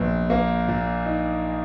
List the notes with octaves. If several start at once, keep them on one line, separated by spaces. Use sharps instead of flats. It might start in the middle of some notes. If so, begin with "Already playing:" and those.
Already playing: A#1 A#2 F#3 B3
A#3
A#2
D#4